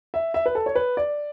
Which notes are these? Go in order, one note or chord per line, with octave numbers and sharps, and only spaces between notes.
E5
E5
B4
A4
C#5
B4
D5